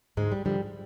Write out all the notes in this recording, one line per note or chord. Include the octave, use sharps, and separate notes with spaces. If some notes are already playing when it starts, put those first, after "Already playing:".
D2 G#2 G#3
G3
D3 F3 G3